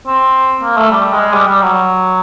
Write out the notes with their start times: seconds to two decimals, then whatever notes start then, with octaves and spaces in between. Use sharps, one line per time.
0.07 C4
0.63 A#3
0.77 A3
0.91 G3
1.13 G#3
1.34 G3
1.48 G3
1.62 F#3